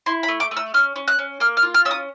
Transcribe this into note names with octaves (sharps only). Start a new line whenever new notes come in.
E4 C6
B5
A3
D6
A3
E6
C#4 F6
C#4
F#6
C#4
A#3 F6
F6
F4
F6
C#4 E6
D#6